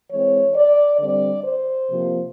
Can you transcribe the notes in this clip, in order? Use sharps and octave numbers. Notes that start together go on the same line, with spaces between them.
E3 G#3 C4 C#5
D5
D3 G3 C4 D5
C5
C3 F3 A#3